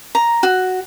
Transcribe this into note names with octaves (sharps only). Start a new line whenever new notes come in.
A#5
F#4